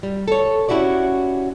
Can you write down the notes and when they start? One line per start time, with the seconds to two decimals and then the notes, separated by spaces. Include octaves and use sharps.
0.03 G3
0.28 A4 C#5
0.69 C#4 E4 F#4 G4 D5